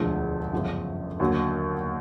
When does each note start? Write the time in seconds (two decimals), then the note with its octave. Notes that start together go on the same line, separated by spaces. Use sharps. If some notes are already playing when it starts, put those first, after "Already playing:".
Already playing: E1 D2 D3 F3 G#3
0.53 G1 F#2 C#3 F3
1.20 D#2 D3 F#3